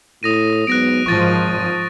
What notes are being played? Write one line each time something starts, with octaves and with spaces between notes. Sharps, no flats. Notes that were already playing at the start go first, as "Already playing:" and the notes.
A2 D#6 A#6 D#7
G#2 F#3 B3 F#6 A#6 D7
G#1 G#2 F3 C#6 A6 A#6